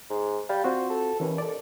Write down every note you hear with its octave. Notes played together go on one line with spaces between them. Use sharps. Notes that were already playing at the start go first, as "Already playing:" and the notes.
G#2
G3 F5
C4 F4 F#4 C5
A4
D#2 E3 C#4 B4
A4 D5